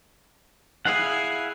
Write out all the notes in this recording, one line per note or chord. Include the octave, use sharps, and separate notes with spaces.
E4 G#4 F5 F#5